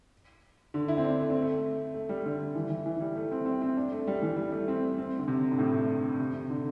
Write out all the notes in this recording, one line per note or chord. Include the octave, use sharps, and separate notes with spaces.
D3
E4
C4
D4
A3
C4
A3
A3
G3
D3
D3
E3
E3
E3
G3
A3
C4
C4
C4
D4
A3
G3
E3
G3
A3
C4
C4
D3
C3
G2
A2
C3
C3
D3